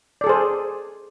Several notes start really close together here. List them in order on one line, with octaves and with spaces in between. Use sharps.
D5 A4 G#4 C5